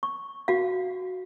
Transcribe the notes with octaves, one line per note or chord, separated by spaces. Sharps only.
C#6
F#4 F5